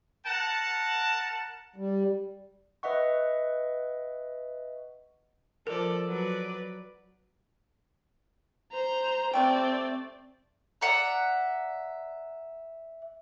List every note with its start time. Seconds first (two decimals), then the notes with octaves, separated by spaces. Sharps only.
0.26 A#4 F#5 A5
1.76 G3
2.83 B4 D#5 E5 F#5 C#6
5.67 F3 A4 A#4 D5
6.07 F#3 B4 D5
8.73 C5 A#5
9.33 C3 A3 C4 D5 G5
10.81 D5 E5 F#5 A#5